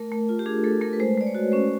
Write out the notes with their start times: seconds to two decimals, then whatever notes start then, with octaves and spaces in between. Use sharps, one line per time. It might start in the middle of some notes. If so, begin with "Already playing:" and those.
Already playing: A3 A#4
0.12 A3
0.29 F4
0.39 G4
0.46 D4 G#4
0.64 A3 A4
0.81 A3 A#4
0.93 B4
1.00 G#3 C5
1.17 G#3 D5
1.26 C#5
1.35 F#4
1.52 C#4 C5